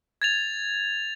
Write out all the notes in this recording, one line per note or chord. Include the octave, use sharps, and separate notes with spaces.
G#6 A6 F7